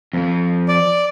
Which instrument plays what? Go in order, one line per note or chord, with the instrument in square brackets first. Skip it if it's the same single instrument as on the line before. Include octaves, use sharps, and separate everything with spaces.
[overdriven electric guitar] F2 F3
[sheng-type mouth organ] D5